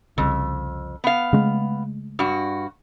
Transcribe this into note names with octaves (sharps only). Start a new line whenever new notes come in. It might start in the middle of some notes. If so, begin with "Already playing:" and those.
C2 F2 C#3
B3 F5
C#3 G#3 A3
G2 F#4